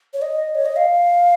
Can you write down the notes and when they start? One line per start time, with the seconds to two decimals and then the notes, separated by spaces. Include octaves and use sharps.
0.14 C#5
0.22 D#5
0.55 C#5
0.66 D#5
0.76 F5